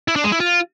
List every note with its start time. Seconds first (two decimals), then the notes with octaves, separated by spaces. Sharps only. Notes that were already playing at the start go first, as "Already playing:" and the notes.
0.08 E4
0.16 D4
0.24 G#3
0.32 E4
0.40 F4